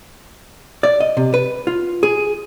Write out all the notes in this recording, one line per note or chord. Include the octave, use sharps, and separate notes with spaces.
D5
D#5
C3
B4
F4
G#4